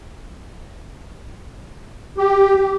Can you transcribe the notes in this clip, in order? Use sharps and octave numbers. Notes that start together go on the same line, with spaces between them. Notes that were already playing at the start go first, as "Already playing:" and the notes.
G4